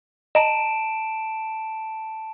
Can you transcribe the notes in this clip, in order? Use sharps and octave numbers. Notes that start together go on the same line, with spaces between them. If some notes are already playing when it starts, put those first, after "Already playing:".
D#5 A5 A#5 D7 E7